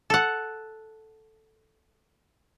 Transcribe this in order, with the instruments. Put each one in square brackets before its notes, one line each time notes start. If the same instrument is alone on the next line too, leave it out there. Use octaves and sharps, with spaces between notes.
[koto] A4 F#5